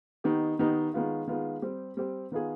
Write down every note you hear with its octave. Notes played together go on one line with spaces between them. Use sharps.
D#3 B3 D#4 G4
D#3 B3 D#4 G4
D#3 G#3 B3 F4
D#3 G#3 B3 F4
G3 C4 G4
G3 C4 G4
D#3 B3 F4 G#4